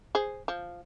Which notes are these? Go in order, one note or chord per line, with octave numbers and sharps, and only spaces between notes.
G#4 C5
F3